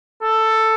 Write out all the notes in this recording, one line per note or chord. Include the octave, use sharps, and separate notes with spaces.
A4